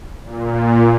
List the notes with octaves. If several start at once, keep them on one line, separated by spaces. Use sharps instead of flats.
A#2